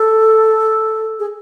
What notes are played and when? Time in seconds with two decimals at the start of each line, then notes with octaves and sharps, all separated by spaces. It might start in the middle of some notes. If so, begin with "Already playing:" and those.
Already playing: A4
1.19 G#4